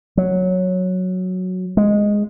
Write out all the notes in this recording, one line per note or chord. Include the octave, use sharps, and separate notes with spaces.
F#3
G#3